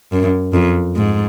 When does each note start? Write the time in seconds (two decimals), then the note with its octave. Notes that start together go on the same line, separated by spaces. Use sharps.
0.12 F#2
0.53 F2
0.96 G#2